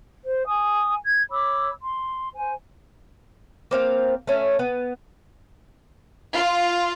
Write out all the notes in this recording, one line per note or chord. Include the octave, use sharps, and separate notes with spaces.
C5
G#5 D#6
G#6
C#5 B5 D6 E6
C6
C5 G#5
A#3 C4 F5
A3 C#4
B3
F4